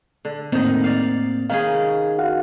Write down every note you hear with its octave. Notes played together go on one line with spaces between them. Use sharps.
D3
A2 D#3 A#3 C4 D#4
D5 F5
D#3 C#4 G#4 F5
F#4 F5 F#5